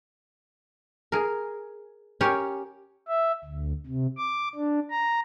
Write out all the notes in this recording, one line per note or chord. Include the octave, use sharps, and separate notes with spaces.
G#4 A#4
C#4 G4 A#4 C#5
E5
D2
C3
D6
D4
A#5